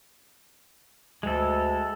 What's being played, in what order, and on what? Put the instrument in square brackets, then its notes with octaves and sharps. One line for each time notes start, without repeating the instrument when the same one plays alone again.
[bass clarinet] D2 [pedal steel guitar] G#3 A4